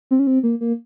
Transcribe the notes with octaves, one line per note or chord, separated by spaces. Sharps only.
C4
C#4
C4
A#3
A#3